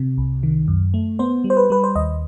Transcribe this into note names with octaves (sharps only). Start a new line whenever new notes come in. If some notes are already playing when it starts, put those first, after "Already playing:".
Already playing: C3
C2
D#3
F#2
A3
B3 C5
G3
C5
B4
G3 B4
C5
D#2 D#5